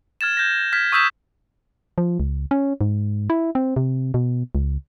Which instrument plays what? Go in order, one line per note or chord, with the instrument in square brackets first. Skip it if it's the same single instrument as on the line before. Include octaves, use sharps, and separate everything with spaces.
[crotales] F6 G#6 A6 E7
G6 A#6
F6 G#6 B6
C#6 D#6 E6 G6 B6 E7
[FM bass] F3
C#2
C#4
G#2
E4
C4
C3
B2
C#2